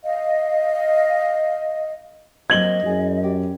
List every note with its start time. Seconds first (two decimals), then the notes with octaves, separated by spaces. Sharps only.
0.05 D#5 F5
2.50 F#3 A#3 C4 D#5 G#6 F#7 G7
2.83 F#2 E4 G#4
3.24 G4